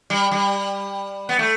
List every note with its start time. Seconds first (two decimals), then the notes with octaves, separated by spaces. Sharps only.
0.10 G3
0.31 G3
1.29 B3
1.39 A3